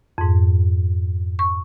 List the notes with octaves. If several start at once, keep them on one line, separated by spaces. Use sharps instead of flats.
F2 G#2
C#6